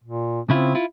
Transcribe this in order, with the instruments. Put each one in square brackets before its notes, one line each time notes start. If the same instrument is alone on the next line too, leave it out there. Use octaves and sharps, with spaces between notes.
[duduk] A#2
[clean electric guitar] C#3 E4 F4 [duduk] C4
[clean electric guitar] E4 F4